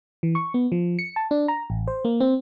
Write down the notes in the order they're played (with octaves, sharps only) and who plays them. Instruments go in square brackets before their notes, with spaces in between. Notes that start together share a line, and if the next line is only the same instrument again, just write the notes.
[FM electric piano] E3
C#6
B3
F3
C#7
A5
D4
A#5
A1
C5
A#3
C4